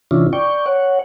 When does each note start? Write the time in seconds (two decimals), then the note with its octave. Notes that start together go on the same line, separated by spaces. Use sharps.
0.11 C3 E3 C#4 D4 E4 F4
0.33 D5 G5 C#6
0.66 C#5 F#5